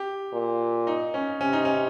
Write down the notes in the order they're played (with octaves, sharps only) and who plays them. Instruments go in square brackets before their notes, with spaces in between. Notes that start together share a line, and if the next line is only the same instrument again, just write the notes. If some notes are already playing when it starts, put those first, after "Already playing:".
Already playing: [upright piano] G4
[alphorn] A#2
[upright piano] D#4
C#4
[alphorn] C3 [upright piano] C#4
[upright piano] D#4
C#4